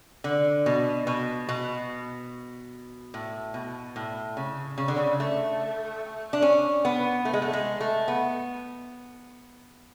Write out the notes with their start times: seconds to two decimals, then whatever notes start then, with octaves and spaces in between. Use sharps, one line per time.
0.24 D3
0.66 B2
1.07 B2
1.49 B2
3.14 A2
3.54 B2
3.96 A2
4.37 C#3
4.78 C#3
4.88 D3
4.97 C#3
5.20 A3
6.33 D4
6.42 C#4
6.85 B3
7.25 A3
7.33 G#3
7.42 A3
7.53 G#3
7.81 A3
8.08 B3